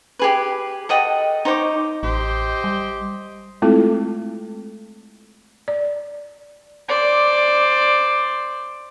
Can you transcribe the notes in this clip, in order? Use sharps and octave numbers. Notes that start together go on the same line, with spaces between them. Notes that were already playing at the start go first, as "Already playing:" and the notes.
G4 G#4 B4
A4 D#5 F#5 G5
D#4 C5 C#5 D6
A1 G4 C5 D#5
G3
G#3 A3 C4 E4 F4 A4
D5
C5 D5